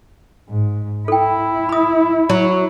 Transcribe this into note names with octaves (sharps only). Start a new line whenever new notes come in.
G#2
E4 A4 G5
B5 D#6
F#3